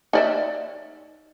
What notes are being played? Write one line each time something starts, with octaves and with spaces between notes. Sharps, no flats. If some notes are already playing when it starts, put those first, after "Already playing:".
D#4 D5 E5